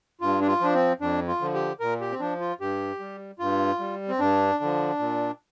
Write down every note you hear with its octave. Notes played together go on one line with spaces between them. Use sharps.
G2 F4
D4
F4
F3 D4
C4
F2 D4
F4
D3 F3
G4
A#2 A#4
G4
C4
F3 D4
F4
G2 G4
G3
G2 F4
G3
C4
G2 D4
D3 F3
A#2